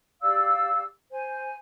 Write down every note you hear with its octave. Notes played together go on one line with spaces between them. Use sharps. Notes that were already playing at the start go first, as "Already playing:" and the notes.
G4 D5 F5 E6
C5 G#5